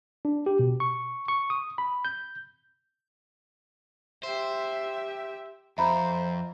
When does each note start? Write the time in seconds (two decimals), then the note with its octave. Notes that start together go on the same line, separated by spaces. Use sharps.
0.25 D4
0.46 G4
0.59 B2
0.80 C#6
1.28 C#6
1.50 D#6
1.78 B5
2.05 G6
4.23 G4 C5 E5
5.78 F2 C5 E5 A#5 B5